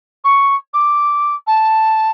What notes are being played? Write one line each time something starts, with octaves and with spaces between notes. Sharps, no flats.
C#6
D6
A5